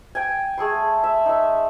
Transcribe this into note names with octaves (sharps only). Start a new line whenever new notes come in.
G5 G#5
A3 G#4 A4 C6
E5
D#4 E5